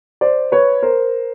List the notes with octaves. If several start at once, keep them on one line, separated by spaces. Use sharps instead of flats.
C5 D5
B4 C#5
A#4 C5